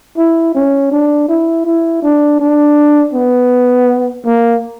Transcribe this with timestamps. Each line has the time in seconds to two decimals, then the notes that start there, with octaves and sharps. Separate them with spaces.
0.17 E4
0.55 C#4
0.91 D4
1.28 E4
1.65 E4
2.03 D4
2.39 D4
3.13 B3
4.25 A#3